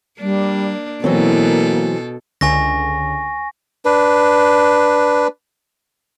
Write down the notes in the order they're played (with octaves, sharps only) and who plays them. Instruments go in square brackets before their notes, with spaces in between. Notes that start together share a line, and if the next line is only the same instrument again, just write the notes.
[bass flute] G3 [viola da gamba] A#3 D4
[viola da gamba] B2 A4 [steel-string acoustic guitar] E3 F#3 C4 [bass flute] A#3
[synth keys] C#2 D3 [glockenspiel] G#5 C#6 A#6
[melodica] D4 B4